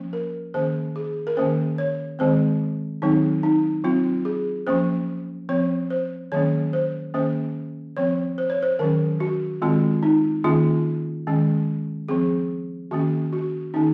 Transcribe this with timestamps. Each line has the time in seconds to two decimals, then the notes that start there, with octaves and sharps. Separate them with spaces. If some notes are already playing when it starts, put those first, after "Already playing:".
Already playing: F3 A#3 C#4
0.13 A#4
0.54 D#3 A#3 C#4 C5
0.96 G#4
1.27 A#4
1.37 D#3 A#3 C#4 C5
1.78 C#5
2.19 D#3 G#3 C4 C5
3.02 D#3 F#3 C4 D#4
3.43 D#4
3.84 F#3 C4 F4
4.25 G#4
4.67 F3 A#3 C#4 C5
5.49 F3 C4 C#5
5.90 C5
6.32 D#3 F#3 A#3 C#4 C#5
6.73 C5
7.14 D#3 A#3 C#4 C5
7.97 F3 C4 C#5
8.38 C5
8.50 C#5
8.63 C5
8.79 D#3 F#3 C#4 A#4
9.20 F#4
9.62 D#3 G#3 C4 F4
10.03 D#4
10.44 D#3 A#3 C#4 F4
11.27 D#3 G#3 C#4
12.09 F3 C4 G#4
12.91 D#3 A#3 C#4 F#4
13.33 F#4
13.74 D#3 A#3 C#4 D#4